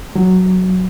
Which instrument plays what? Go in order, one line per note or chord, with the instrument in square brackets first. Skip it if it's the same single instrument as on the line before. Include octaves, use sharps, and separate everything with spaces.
[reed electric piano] F#3